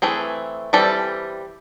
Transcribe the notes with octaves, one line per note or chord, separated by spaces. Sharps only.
E3 A3 C4 G#4
E3 G3 C4 A4